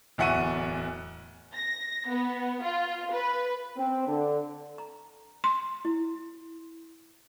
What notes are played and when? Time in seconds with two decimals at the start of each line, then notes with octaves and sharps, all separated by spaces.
0.18 D1 E2 E5 F#5 C#6 D#7
1.55 A#6
2.08 B3
2.63 F4
3.12 B4
3.78 C4
4.08 D3
4.78 A#5
5.44 C6
5.85 E4